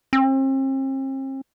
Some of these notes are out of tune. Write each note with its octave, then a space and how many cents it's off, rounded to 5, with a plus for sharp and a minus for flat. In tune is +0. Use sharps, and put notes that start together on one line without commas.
C4 +40